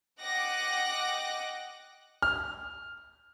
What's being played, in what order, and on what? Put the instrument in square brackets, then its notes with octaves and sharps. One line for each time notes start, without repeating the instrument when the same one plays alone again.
[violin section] D#5 F#5 G5 D6 F#6 A#6
[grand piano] F6